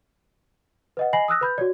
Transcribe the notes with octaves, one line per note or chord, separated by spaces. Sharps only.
B4 D#5 F#5
D#5 G#5 B5 A#6 C7 F#7
D#6 E6 F#6 A#6
B4 B5 G6
F#4 C#5 D5